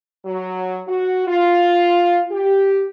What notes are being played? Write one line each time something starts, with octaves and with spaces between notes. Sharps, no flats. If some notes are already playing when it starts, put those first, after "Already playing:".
F#3
F#4
F4
G4